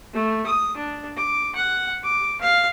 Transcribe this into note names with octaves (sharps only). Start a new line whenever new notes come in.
A3
D#6
D4
D6
F#5
D6
F5